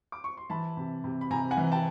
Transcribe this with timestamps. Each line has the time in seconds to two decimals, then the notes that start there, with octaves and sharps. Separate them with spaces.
0.12 D6
0.24 C#6
0.37 C6
0.50 E3 A5 B5
0.77 C3
1.04 C3
1.21 B5
1.31 C3 G#5 A#5
1.51 F#5 G#5
1.57 E3
1.72 G5 A5